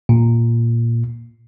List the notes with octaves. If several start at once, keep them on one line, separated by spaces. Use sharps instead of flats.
A#2